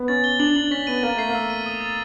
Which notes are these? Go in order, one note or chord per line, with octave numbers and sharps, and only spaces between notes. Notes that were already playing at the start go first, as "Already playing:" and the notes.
Already playing: B3
C#4 A6
G7
D4 F#7
D4 F#7
C#4 B6
B3 D#7
A#3 A6
A3 C7
A#3
E6
D#7
D#6
A6